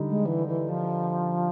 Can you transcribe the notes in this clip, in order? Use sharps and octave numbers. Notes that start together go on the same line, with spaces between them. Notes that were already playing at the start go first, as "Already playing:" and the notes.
Already playing: D3 G3 D#4
G#3
E3
E3
F3